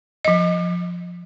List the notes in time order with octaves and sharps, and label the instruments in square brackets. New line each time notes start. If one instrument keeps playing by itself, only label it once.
[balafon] F3 D#5